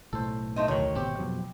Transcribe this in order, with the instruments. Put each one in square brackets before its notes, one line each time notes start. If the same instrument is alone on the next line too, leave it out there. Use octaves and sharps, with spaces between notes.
[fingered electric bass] B1 A2 [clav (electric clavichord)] A4 C5
[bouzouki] A3 C4 D#4
[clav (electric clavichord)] D2 D#3 [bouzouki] C#5
[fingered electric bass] G#1 B2 [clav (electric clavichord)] C4 G4
[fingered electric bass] F2 B2 F#3